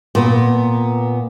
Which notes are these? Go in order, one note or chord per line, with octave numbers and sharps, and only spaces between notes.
A#2 B3